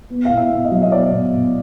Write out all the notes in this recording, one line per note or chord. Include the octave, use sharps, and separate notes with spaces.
B3
B2 F5
E5
B2
D#5
F#3
D#5
B3 D5
B2
B2